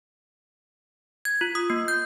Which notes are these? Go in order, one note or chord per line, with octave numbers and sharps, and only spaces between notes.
G#6
F4
D#6
A#3
G6